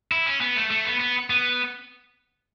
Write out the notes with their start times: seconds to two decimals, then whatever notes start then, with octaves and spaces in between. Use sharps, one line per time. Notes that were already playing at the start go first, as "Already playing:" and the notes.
0.12 E4
0.26 C#4
0.41 B3
0.56 A3
0.71 A3
0.85 B3
1.00 B3
1.30 B3